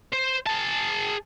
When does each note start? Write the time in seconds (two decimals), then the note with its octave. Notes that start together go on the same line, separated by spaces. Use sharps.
0.13 C5
0.47 G#4 A5